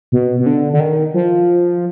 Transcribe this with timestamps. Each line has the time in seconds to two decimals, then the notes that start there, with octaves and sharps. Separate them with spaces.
0.12 B2
0.40 B2
0.46 D3
0.73 D3
0.80 D#3
1.14 F3